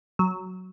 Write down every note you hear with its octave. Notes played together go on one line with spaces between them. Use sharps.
F#3